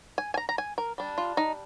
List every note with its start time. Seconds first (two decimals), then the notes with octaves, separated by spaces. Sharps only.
0.18 G#5
0.34 G#5
0.37 A#5
0.49 A#5
0.58 G#5
0.78 A#4
0.98 G3 D4
1.18 F4
1.37 D#4